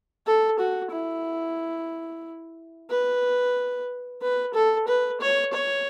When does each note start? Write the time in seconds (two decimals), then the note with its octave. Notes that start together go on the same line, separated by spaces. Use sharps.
0.27 A4
0.59 F#4
0.92 E4
2.90 B4
4.22 B4
4.54 A4
4.88 B4
5.21 C#5
5.53 C#5